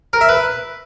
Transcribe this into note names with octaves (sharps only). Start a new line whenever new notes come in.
A#4
E5
B4